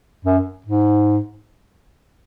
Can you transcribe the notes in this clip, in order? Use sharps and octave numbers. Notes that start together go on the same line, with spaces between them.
F#2
G#2